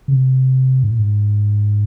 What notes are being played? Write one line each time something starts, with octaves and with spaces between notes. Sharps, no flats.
C#3
C3
G#2
A#2
G#2